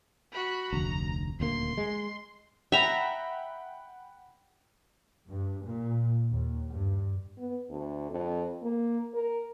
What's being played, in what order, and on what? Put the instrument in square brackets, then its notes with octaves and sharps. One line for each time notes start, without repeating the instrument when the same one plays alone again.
[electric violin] F#4 B5
[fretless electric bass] F1 D2 [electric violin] A#5
[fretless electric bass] D#1 D2 A#3 [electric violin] C6
[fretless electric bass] G#3
[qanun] E5 A#5 [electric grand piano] F#5 G5 B5
[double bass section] G2
A#2
D#2
G2
[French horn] B3
D2
F2
A#3
A#4